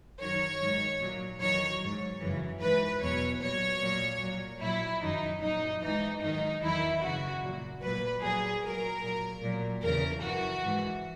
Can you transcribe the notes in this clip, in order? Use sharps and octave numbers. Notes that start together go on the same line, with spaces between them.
F#2 D#3 F#3 C#5
G#2 D#3 F#3
A#2 F#3
E2 D#3 F#3 C#5
G#2 F#3
F#2 C#3 E3
G#2 E3 B4
E2 B2 F#3 C#5
A#2 F#3 C#5
A#2 F#3
A#2 F#3
A#2 F#3 E4
F#2 D#3 F#3 D#4
A#2 F#3 D#4
G#2 E3 D#4
G#2 D#3 F#3 D#4
E2 D#3 F#3 E4
F#2 C#3 E3 F#4
A#2 F#3
A#2 F#3 B4
A#2 F#3 G#4
A#2 F#3 A#4
A#2 F#3
A#2 F#3
E2 C#3 E3 A#4
F#2 E3 F#4
G#2 E3